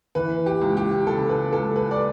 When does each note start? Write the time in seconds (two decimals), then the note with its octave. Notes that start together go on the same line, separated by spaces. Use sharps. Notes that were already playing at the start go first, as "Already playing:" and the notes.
0.15 E3 B4
0.46 G4
0.61 C#2
0.77 G4
1.07 C#3 A4
1.29 B4
1.52 C#2 A4
1.76 B4
1.91 D5